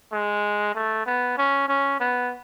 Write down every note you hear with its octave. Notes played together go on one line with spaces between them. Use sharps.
G#3
A3
B3
C#4
C#4
B3